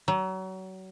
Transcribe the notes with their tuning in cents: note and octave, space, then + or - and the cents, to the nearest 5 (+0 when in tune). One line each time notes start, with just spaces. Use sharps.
F#3 +30